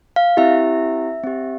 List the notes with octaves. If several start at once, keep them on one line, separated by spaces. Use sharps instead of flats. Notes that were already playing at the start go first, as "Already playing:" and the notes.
F5
C4 E4 G4 E5
C4 G4